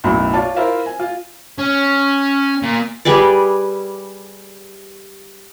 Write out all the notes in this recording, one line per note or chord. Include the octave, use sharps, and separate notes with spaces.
B1 F#2 A2 E4 B5
F4 C#5 D5 A5
E4 F4 A#4 C5 E5 F5
G#5
F4
C#4
A#2
G3 G#4 B4 D5